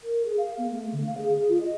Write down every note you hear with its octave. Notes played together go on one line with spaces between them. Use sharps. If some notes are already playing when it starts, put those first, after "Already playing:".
A#4
G#4
F5
B3
A3
D3
F5
G#4
G#4
F4
D#5